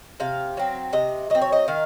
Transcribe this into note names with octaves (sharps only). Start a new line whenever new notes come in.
C3 F5
F#3 C4
C3 D#5
F#3 C4 D#5
C#5
D#5
D#3 F5